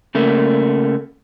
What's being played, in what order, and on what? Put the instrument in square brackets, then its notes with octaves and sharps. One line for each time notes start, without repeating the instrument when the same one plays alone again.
[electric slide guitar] C#3 A3 A#3